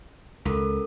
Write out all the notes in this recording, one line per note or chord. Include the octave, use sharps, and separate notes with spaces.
C#2 C#4 A4 A#4